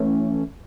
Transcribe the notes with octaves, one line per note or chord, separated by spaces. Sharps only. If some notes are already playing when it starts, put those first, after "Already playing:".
Already playing: E3 A3 C#4